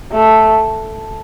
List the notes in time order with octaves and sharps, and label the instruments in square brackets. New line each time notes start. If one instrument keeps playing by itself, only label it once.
[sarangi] A3